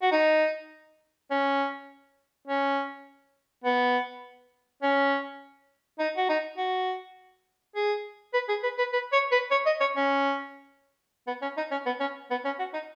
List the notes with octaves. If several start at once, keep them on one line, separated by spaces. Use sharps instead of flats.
F#4
D#4
C#4
C#4
B3
C#4
D#4
F#4
D#4
F#4
G#4
B4
G#4
B4
B4
B4
C#5
B4
C#5
D#5
C#5
C#4
B3
C#4
D#4
C#4
B3
C#4
B3
C#4
F#4
D#4